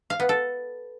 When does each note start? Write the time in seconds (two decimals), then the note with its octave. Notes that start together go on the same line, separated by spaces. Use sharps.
0.10 F5
0.20 B3
0.29 A4